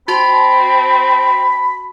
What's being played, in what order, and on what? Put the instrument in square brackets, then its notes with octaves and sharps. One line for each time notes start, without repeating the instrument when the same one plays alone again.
[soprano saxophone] C4 [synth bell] F#4 A5 C6 [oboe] B5